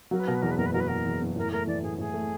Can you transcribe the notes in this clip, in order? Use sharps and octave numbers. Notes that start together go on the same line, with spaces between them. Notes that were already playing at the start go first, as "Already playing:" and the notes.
F#3 A#4
B4
B2 A#4
B4
E2 A#4
B4
F#1 A#4
B4
F#3 A#4
B4
B2 A#4
E2
F#1
A2 A#4
A3 A#4
E3 D5
A2 G#4
A2 G#4
A3